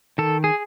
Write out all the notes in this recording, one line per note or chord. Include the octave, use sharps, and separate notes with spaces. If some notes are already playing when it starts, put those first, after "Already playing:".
D#3 A4
G#4